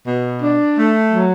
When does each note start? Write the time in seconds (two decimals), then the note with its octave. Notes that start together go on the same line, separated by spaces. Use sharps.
0.06 B2
0.41 D4
0.77 A3
1.13 F#3